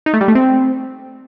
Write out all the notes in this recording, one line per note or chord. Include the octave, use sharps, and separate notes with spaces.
D#4
A3
G3
A3
C4